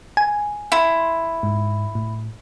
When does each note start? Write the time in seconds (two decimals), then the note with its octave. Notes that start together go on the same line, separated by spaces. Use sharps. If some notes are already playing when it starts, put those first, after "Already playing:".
0.17 G#5
0.72 E4 C6
1.43 G#2
1.95 A2